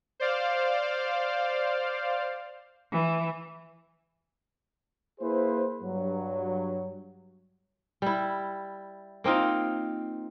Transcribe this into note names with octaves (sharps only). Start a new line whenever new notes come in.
C5 D5 F5
E3
A#3 E4 G#4 B4 C5
G2 F#3
G3 E4
A#3 C4 D#4 F4